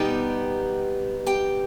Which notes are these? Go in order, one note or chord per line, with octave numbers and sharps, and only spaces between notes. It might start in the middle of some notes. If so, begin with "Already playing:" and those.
Already playing: B2 G3 B3 D#4 G4 G5
G4 G5